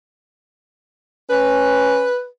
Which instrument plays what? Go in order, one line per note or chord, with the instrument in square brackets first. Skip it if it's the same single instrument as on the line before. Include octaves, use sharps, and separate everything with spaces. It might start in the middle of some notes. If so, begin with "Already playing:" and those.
[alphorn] C#4 [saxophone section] B4